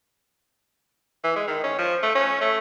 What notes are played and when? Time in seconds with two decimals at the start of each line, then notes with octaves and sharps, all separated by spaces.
1.24 E3
1.36 G#3
1.48 D#3
1.64 C#4
1.79 F3
2.03 A3
2.15 C#4
2.41 A3